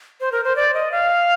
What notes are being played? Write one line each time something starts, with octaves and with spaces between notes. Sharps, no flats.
C5
A#4
C5
D5
D#5
F5